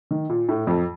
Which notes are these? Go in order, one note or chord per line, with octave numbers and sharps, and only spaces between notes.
D#3
A#2
A2
F2